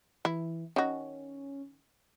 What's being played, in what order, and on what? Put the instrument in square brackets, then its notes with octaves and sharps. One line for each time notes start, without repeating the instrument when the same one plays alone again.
[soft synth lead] E3 [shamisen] E4
[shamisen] D#3 F#4 [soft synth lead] C#4